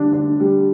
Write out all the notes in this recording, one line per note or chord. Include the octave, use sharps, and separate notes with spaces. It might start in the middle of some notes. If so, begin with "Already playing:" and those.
Already playing: D3 G3 D4
D4
G3